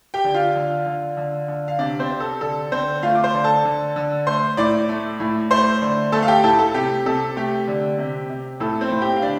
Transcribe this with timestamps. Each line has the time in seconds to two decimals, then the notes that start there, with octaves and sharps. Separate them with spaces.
0.14 G4 G5
0.24 D3
0.34 F4 F5
0.55 D3
0.86 D3
1.17 D3
1.48 D3
1.68 F5
1.79 C3 D4 D5
2.00 C4 C5
2.10 C3
2.20 A4
2.41 D3 A4
2.72 D3 C4 C5
3.03 A3 F4 F5
3.15 D6
3.23 C5 C6
3.34 D3
3.44 A4 A5
3.65 D3
3.96 D3
4.27 A3 C5 C6
4.57 A2 D5 D6
4.89 A3
5.20 A2
5.51 A3 C5 C6
5.82 D3
6.12 A3 A4 A5
6.22 F5
6.28 G4 G5
6.44 A2 A4 A5
6.59 A4
6.74 C3 G4
7.06 C3 A4
7.36 A3 G4
7.67 D3
7.98 C3
8.30 C3
8.60 A2 A4
8.81 C4 C5
8.91 A2
9.02 G4 G5
9.16 F5
9.22 D3 D4 D5